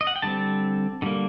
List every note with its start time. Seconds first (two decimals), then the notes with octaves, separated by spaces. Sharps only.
0.01 D#5
0.07 F#5
0.16 G5
0.22 D3 G3 C4 A5
1.02 D3 G3 A#3